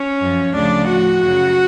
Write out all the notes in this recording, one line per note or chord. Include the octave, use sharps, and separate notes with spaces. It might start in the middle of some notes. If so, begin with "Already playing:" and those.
Already playing: C#4 C#5
F#2 F3
D2 C#3 F3 D4 D5
A2 F3 F#4 F#5
F#2 C#3 F#3